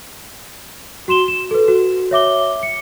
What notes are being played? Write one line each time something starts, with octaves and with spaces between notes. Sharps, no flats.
F#4 C6 E7 G7
E7
A4 B4
F#4
C#5 E5 D6 G7
C#7